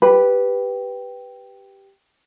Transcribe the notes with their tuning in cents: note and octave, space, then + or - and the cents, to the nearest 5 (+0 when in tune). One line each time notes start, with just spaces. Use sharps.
G4 +0 B4 +0